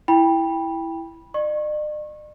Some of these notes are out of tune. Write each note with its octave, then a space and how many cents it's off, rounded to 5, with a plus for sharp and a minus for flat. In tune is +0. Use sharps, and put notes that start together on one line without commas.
E4 +0 G5 +15 B5 -15
D5 +45 C#6 -30